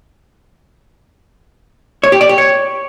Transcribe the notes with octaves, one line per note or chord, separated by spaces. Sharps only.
C#5
G4
D5
G4
C#5